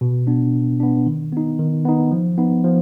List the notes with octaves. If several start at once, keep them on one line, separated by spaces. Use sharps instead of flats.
B2
B3 D4
B2
B3 D4
D#3
B3 D#4
D#3
B3 D#4
F3
B3 D#4
F3